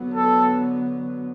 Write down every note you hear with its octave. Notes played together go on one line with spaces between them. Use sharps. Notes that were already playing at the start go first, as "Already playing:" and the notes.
Already playing: D3 F#3 B3
A4